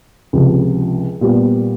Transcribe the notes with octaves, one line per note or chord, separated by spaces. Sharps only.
C#2 C3 F3
A#2 G3 B3